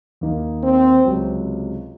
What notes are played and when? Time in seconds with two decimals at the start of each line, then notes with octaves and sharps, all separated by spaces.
0.21 D#2 D#3 A#3 D#4
0.63 C4
1.04 C#2 C3 F#3